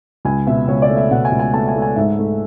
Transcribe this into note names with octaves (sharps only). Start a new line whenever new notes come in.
C#2 G#5
B2 E5
C#2 C#5
D5
A3
E5
B2 F#5
G#5
C#2
G#5
A3 A5
G#5
A3
G#5
G#2 E5
A3